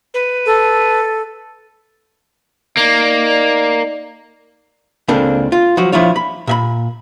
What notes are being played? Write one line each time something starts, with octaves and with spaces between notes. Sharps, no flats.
B4
A4
A#3 D#4 D5
C#2 A#3 C4 D4 A4
F4
F3 F#3 F#4
F3 D4 E4 F4 C#5
B5
A#2 E5 B5